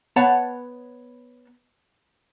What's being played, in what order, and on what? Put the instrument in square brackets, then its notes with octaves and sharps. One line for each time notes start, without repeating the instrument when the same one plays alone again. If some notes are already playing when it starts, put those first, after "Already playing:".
[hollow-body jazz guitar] B3 C#5 F#5 A5